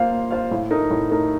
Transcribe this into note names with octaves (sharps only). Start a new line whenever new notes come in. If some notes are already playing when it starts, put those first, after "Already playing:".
Already playing: A#3 F4 C5 F5
A#3
F4 C5 F5
A2
A3 D#4 A#4
A2
A3 D#4 A#4